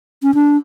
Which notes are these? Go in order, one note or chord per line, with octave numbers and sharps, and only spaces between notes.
C#4
D4